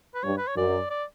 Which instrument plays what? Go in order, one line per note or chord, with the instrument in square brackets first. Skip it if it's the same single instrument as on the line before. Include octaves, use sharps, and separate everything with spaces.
[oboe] B4
[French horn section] G2 [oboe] C#5
[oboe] B4
C#5
[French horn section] F#2 [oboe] D5
[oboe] D5